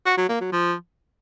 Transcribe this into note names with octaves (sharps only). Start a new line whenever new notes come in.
F#4
F#3
A#3
F#3
F3